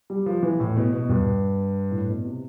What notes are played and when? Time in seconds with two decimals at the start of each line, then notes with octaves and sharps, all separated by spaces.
0.10 G3
0.26 F3
0.43 E3
0.60 A2
0.77 B2
0.93 B2
1.09 G2
1.91 A2
2.08 B2
2.25 C3